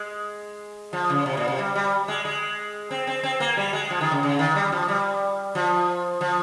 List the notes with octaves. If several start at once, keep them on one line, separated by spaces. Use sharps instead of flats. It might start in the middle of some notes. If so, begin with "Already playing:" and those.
Already playing: G#3
F3
C#3
C3
A#2
C3
G3
G3
G#3
G#3
C4
C4
C4
A#3
G3
G#3
F3
D#3
C#3
C#3
D#3
G3
F3
G3
F3
F3